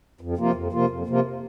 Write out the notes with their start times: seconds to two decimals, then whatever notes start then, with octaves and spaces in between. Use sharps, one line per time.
0.21 F2
0.37 C3 F3 A#3 F4
0.54 F2
0.72 C3 F3 A#3 F4
0.89 F2
1.07 C3 F3 A#3 F4